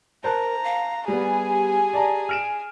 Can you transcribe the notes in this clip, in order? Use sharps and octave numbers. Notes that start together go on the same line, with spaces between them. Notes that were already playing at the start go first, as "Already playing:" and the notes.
A#4 C5 A5 A#5 F#6
F5
G3 B3 G4 G#4 G#5
D5 A5 A#5
F6 D7 E7